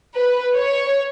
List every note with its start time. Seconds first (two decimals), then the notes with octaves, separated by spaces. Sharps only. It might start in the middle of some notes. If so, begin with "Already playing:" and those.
0.16 B4
0.56 C#5